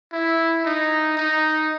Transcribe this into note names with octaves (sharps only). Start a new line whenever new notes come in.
E4
D#4
D#4